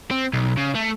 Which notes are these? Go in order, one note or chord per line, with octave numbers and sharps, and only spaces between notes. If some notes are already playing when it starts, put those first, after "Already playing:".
C4
B1
C#3
A3